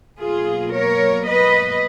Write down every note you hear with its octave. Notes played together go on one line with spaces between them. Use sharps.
B2 F#3 A#3 F4 G#4
A#4 C#5
B4 D#5